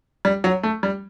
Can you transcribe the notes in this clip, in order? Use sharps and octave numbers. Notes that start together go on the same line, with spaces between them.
G3
F#3
A3
G3